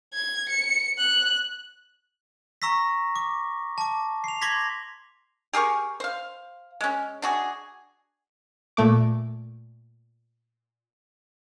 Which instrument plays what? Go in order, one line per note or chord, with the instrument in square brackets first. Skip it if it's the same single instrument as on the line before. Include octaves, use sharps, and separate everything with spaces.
[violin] G#6
C#7
F#6
[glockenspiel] A#5 C#6 E6 A#6 B6
D6
A5 D6
C7 F7
C6 D6 G#6 A#6 B6
[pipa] G4 G#4 A#4 C#6
C5 F5
G#3 C#4
D4 F#4 G#4
[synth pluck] A#2 A3 D6